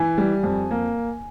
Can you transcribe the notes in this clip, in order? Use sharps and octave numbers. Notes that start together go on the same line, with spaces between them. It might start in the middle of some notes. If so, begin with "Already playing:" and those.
Already playing: E3 G#5
G3
F2
A#3